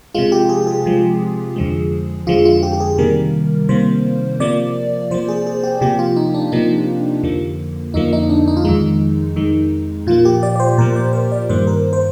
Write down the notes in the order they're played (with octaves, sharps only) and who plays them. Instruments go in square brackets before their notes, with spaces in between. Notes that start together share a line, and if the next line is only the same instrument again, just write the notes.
[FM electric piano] C3 F3 G#3 F4
G4
G#4
G#4
C3 F3 G#3
F2 D3 F3 G#3
F2 D3 F3 G#3 F4
F4
F4
G4
G4
G#4
C3 D#3 G3 A#3 A#4
C3 D#3 G3 A#3 C5
C3 F3 A#3 D5
C3 F3 A#3 C5
G#4
G#4
G4
C3 F3 A#3 G4
F4
D#4
D4
C3 F3 A#3 D#4
F2 D3 F3 A#3
F2 D3 F3 A#3 D#4
D#4
D4
D#4
F4
F2 D#3 G#3 D#4
F2 D#3 G#3
A#2 F3 A#3 F4
G4
D5
D5
C5
A#2 F3 A#3 A#4
D5
C5
D5
G2 D#3 A#3 C5
A#4
C5